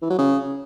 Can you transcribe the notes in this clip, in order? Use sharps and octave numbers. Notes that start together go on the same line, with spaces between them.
E3
F#3
C#3